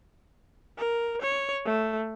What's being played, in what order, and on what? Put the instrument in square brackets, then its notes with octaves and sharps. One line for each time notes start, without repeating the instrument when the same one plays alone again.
[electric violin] A#4
C#5
A3